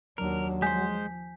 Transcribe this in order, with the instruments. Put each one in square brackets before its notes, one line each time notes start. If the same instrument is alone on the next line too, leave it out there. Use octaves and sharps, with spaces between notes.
[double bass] D#2 D4 [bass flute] F#3 [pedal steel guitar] A#4
[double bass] F3 [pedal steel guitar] G#3 C5 [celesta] G#5 G6 B6